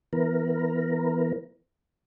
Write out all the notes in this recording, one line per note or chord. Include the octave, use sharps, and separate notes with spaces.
E3 B3 A#4